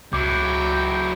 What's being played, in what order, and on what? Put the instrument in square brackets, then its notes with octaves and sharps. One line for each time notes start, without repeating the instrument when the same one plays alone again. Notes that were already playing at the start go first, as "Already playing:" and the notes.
[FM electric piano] C#2 [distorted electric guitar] F#3 E4 [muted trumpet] G5 [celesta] D6